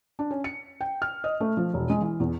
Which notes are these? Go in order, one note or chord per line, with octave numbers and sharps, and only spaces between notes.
D4
C#4
C#7
G5
F6
D#5
A3
F3
E1
G#3
E3
E2